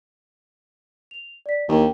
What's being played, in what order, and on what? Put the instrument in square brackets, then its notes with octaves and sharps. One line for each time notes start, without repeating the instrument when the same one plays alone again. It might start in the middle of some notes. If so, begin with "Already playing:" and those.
[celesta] F7
D5 B6
[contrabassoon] D#2 [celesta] D4 A#4 G5